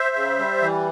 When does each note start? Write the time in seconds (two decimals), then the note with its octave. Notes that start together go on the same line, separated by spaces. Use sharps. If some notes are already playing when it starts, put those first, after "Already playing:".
Already playing: C5 E5
0.16 C#3
0.39 G3
0.62 E3